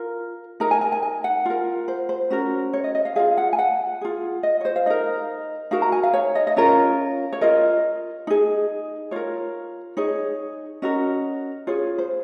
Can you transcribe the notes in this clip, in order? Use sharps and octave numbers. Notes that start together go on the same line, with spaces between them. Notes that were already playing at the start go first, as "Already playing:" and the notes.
Already playing: F4 A#4
D#4 A#4 A#5
G#5
G#5
G#5
G#5
F#5
F4 A#4
C5
C5
C#4 F#4 A#4
C#5
D#5
D#5
F5
F4 G#4 F5
F#5
G#5
F#5
F4 G#4
D#5
C#5
C5
F5
D#4 A#4 D#5
D#4 F#4 A#4 F5
A#5
G#5
F5
C#5
D#5
D#5
C#4 F4 A#4 C#5
C#5
F4 A#4 D#5
D#4 G#4
F4 A#4 C#5
D#4 G#4 C#5
C#4 F#4 A#4 D#5
F4 G#4 C#5
C5